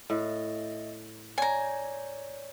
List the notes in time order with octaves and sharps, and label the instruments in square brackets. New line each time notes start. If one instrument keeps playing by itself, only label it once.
[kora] A2 [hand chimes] D#5 E5
[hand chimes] C#5 D5 [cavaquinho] G#5 A#5